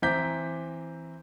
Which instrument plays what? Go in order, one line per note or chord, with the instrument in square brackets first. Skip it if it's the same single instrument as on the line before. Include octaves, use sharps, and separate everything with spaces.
[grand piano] E3 C4 A#5 D6 G6 B6